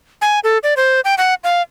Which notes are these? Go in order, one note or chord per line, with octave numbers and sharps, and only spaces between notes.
G#5
A4
D5
C5
G5
F#5
F5